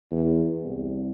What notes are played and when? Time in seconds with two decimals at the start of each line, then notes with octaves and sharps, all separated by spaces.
0.11 E2
0.64 C2